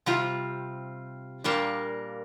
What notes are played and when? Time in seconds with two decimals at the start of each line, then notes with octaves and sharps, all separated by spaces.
0.06 C3 G3 C4 F4
1.44 A#2 G3 A#3 D4